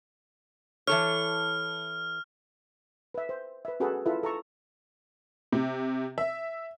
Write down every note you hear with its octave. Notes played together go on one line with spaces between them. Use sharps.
E3 A4 C#5 F6
B4 E5
C5
B4 E5
C#4 F#4 G#4 A4 B4
E4 F4 A4 B4 E5
A4 A#5 C#6
C3
E5